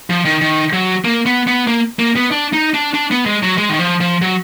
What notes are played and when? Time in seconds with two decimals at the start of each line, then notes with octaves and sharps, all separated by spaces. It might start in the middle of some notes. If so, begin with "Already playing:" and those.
0.10 F3
0.25 D#3
0.42 D#3
0.73 F#3
1.05 A#3
1.26 B3
1.47 B3
1.67 A#3
1.99 A#3
2.16 B3
2.31 D4
2.53 D#4
2.74 D4
2.94 D4
3.11 B3
3.26 G#3
3.43 F#3
3.58 G#3
3.69 D#3
3.79 F3
4.01 F3
4.22 F#3